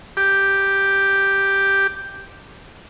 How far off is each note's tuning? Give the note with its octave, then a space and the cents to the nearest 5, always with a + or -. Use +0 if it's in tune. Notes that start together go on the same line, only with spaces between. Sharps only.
G4 +0